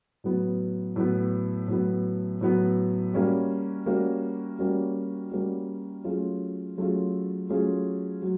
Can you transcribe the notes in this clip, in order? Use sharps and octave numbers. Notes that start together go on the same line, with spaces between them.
A2 F#3 B3
A2 F#3 B3
A2 F#3 B3
A2 F#3 B3
G3 A#3 C#4 F#4
G3 A#3 C#4 F#4
G3 A#3 C#4 F#4
G3 A#3 C#4 F#4
F#3 A3 C#4 F4 G#4
F#3 A3 C#4 F4 G#4
F#3 A3 C#4 F4 G#4
F#3